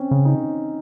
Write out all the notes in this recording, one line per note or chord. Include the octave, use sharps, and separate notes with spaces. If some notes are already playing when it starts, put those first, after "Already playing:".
Already playing: C4 C#4
C#3
D#4